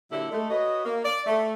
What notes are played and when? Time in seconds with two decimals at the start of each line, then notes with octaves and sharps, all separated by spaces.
0.11 A#2 D3 F#3 E4 G4 A4
0.31 G#3 A3
0.50 F#4 B4 C#5 D#5
0.85 A#3
1.05 D5
1.26 A3